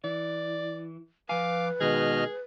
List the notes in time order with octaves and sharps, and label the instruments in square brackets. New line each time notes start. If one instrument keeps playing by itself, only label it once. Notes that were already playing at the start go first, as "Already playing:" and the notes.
[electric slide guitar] E3 [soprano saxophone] D5
[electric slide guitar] F3 G#5 [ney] B4 [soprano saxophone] F5 [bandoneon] D6
[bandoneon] B2 D#5 F6 [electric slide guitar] D#3 G#3 [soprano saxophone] G#4